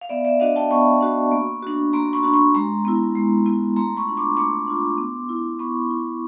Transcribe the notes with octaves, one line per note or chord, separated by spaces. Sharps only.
F5
B3 D5 E5
D5 E5
D4 F#4 D#5 F5
G5 A5
B3 B5 C#6
D4 F#4
A#3
D4 F#4
A#3 A#5 C6
B5 C#6
D4 F#4
B5 C#6
G#3 A#5 C6
B3 E4
G#3
B3 E4
A3 A#5 C6
B5 C#6
D4 F4
C6 D6
A3 C6 D6
D4 F4
B3
E4
B3 B5 C#6
E4